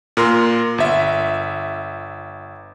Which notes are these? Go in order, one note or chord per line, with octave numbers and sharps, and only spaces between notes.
A#2 A#4 C6
G1 E5